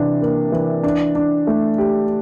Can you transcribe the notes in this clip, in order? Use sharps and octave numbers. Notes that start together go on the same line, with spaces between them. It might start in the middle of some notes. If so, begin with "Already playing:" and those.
Already playing: C3 E3 D4
A#3
E3
D4
D4
A3
G4